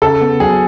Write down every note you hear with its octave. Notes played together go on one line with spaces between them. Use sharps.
C#3 A4
B3
F#3 G#4